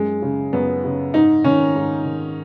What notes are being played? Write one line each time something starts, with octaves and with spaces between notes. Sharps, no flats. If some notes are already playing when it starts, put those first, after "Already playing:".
Already playing: F#2 G#3
C#3
F#2 B3
C#3
G#2 D#4
D#3 C#4
G#2
D#3